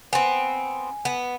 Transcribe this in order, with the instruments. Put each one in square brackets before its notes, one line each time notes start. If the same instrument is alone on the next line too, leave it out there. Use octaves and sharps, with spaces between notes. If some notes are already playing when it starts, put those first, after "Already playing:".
[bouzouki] B3 C4 [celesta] G#5
[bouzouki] B3